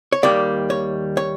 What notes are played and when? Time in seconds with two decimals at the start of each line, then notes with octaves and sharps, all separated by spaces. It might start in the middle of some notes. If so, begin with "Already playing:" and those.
0.12 C#5
0.23 D#2 D#3 G3 A#3 D5
0.70 C#5
1.17 C#5